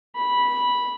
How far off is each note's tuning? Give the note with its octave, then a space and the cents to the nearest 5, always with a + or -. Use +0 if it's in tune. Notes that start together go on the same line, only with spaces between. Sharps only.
B5 -10